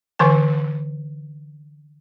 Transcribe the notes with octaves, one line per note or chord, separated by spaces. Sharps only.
D3 E3 G#5